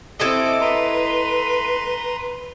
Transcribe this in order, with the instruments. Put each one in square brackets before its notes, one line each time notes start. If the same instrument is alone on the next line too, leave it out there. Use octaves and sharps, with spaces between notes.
[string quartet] C4 D6 [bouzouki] E4 A4 D#5
[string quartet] B4 [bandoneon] A#5 C6